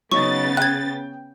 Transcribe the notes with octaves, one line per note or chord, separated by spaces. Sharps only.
C#3 F#3 B3 D#4 C#6 A6
G5 F#6 G#6